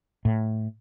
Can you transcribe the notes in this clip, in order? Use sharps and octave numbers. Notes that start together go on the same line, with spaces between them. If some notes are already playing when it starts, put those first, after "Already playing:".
A2